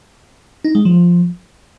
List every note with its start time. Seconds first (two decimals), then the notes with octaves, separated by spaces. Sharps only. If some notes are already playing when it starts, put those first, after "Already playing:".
0.64 D#4
0.75 G#3
0.85 F3